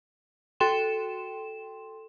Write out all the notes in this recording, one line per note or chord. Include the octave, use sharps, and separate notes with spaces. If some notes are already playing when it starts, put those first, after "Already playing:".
F#4 A4 G5 C6 E7